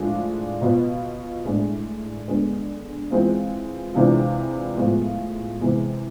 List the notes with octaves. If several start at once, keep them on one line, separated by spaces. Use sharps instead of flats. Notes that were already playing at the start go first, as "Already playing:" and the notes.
Already playing: A2 F3 G#3 D4 F4
B2 B3 F4
A2 G#3 D4
D3 G#3 B3
E3 G#3 C4 F4
C3 E3 G#3 D4 F4
A2 F3 G#3 B3 F4
C3 E3 G#3